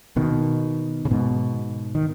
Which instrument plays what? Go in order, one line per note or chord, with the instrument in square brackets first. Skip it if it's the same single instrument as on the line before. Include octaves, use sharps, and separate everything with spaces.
[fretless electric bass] B2 D#3
C#3
G#2 B2
D#3